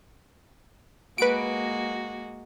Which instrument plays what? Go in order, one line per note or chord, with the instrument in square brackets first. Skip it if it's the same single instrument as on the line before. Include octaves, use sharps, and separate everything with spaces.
[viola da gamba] G#3 A#3 F#4 [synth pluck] B4 D7